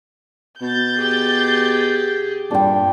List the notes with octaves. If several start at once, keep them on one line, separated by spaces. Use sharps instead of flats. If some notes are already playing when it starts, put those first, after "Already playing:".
B2 G6 A6
G4 G#4
G2 A#2 D4 G5